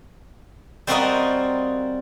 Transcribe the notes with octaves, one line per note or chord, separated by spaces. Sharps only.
G3 C4 F4 F#4 A#4 D#5